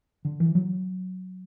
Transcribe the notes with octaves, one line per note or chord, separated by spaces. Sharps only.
D3
E3
F#3